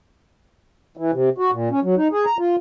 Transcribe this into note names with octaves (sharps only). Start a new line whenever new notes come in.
E3
C3
F#4
A#2
C#4
F#3
D#4
G#4
A#5
F4